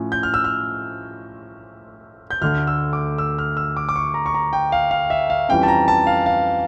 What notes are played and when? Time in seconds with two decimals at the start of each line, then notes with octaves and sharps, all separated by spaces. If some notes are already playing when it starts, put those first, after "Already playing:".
Already playing: A2 F3 C#4
0.12 G6
0.23 F6
0.34 E6
0.44 F6
2.31 G6
2.41 D2 D3 A3 F6
2.67 E6
2.93 D6
3.18 E6
3.39 F6
3.57 E6
3.77 D6
3.89 D6
3.96 C#6
4.14 A#5
4.26 C#6
4.34 A#5
4.53 G5
4.72 F5
4.91 F5
5.10 E5
5.30 F5
5.49 F2 E3 G3 C#4 G5
5.63 A5
5.68 A#5
5.88 A5
6.07 F5
6.26 F5